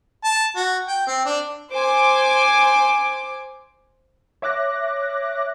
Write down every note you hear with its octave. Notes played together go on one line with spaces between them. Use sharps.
A5
F#4
G5
C4
D4
C5 G#5 D6
C#5 E5 D6 F#6 A#6